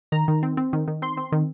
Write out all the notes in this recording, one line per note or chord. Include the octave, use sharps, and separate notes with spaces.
D#3 A#5
D#3
C4
C4
D#3
D#3
C4 C6
C4
D#3